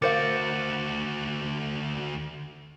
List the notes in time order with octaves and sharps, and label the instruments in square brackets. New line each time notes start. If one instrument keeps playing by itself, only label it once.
[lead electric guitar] D2 F#4 [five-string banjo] A#4 C5 F5 [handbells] D6 A6 C#7